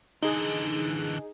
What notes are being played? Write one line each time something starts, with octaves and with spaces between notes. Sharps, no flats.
D3 E3 D#4 G#4